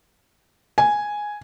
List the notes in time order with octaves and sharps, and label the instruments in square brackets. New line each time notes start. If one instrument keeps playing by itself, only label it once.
[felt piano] G#5